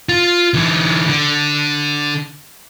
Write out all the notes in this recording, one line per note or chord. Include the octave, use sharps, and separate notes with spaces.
F4
D3 E3
D3